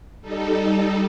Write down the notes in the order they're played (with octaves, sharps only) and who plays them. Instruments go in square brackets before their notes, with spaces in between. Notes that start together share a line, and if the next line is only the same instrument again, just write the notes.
[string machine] G3 D#4 A4